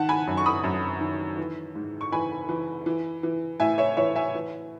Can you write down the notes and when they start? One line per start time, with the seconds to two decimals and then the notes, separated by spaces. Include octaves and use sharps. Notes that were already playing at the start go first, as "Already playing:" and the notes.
Already playing: D#3 F#5 A5
0.09 G#5 B5
0.27 F#2
0.37 C#6
0.46 B5 D#6
0.64 F#2
1.01 D#3
1.37 E3
1.75 G#2
2.01 C#6
2.12 E3 G#5 B5
2.49 E3
2.86 E3
3.23 E3
3.60 A2 E5 G#5
3.78 C#5 E5
3.97 E3 C#5 E5
4.16 E5 G#5
4.35 E3